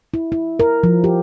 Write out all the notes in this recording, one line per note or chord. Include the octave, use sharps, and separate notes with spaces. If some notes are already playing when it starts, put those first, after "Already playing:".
E4
E4
A#4
F3
G4